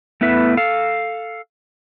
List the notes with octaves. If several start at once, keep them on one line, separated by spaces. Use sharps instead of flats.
A3 B3 E4 B4 E5
A4 F5